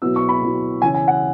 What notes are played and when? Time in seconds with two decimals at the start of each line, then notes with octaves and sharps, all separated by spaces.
0.02 B2 F#3 B3 E4 E6
0.16 C#6
0.29 B5
0.42 B2 F#3 B3 E4
0.82 C#3 E3 C#4 E4 G#5
0.94 G#5
1.08 F#5